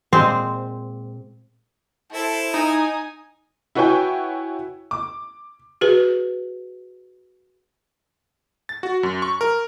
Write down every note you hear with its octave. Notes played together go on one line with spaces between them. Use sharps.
A#2 G#3 C4 C5
E4 A4 C5
D#4 G#5 D#6
E4 F#4 B4 C#5 G5 G#5
D6
F#4 G#4 B4
A6
F#4
F#2
C#6
A#4